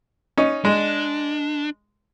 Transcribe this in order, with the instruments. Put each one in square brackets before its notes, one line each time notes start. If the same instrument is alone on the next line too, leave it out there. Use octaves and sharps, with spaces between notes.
[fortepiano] C#4 D#4
[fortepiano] G#3 [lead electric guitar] D4